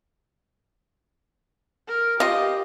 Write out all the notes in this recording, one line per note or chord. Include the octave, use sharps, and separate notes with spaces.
A#4
F4 G4 D#5 F5